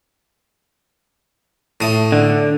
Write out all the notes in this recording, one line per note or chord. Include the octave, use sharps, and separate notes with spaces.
A2 D#6
D3